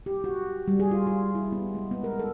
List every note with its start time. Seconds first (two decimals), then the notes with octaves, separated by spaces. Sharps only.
0.06 G4
0.24 F#4
0.68 G3
0.79 G#4
0.91 F4
1.07 F4
1.35 E4
1.52 B3
1.75 G#3
1.91 B3
2.04 A#4
2.19 A4